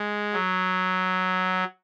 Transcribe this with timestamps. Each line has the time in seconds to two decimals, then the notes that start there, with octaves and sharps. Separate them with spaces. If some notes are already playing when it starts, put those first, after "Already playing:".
Already playing: G#3
0.33 F#3